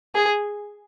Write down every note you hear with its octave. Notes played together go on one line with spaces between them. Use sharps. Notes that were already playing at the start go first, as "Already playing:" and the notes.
G#4